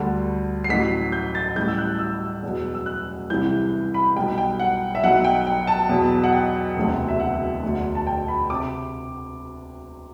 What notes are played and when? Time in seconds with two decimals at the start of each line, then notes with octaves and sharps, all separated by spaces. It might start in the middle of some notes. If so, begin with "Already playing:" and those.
Already playing: D2 D3 G3
0.64 C7
0.69 A1 A2 F#3 B6
1.12 G6
1.35 A6
1.56 A1 A2 G3 G6
1.68 E6
1.78 F#6
1.99 E6
2.42 E2 B2 F#3
2.75 E6
2.86 F#6
3.30 C2 C3 E3 G3 G6
3.94 B5
4.16 B1 B2 G3 G5
4.38 G5
4.60 F#5
4.95 E5
5.03 B1 B2 F#3 F#5
5.24 G5
5.47 G5
5.67 A5
5.89 E2 B2 F#3
6.24 F#5
6.32 G5
6.76 E1 D2 C3 F#3
7.08 E5
7.20 F#5
7.62 E1 D2 D3
7.95 A5
8.07 G5
8.28 B5
8.50 C3 D6